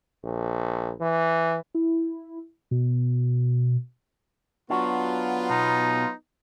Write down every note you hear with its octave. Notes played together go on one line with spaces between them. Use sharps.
A#1
E3
E4
B2
F#3 B3 D4 F4 F#4
B2 D#4